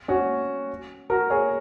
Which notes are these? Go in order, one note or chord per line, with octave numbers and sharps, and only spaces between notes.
C#4 F#4
F#4 A#4
G#4 C#5